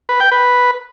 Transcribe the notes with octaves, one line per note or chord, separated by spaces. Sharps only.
B4
G5
B4